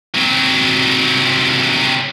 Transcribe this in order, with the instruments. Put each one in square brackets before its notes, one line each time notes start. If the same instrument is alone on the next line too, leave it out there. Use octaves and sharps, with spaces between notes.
[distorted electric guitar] C3 F#3